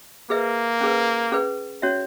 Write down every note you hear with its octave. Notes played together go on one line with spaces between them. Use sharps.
A#3 G#4 B4 E5
C#4 G#4 B4
C#4 G#4 B4
C#4 F#4 C#5 E5